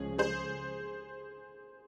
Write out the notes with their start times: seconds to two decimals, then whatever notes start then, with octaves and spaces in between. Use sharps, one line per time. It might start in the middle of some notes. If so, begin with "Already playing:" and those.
Already playing: C#2 C#3 F3 G#3 C#4 G#4
0.18 G#4 C5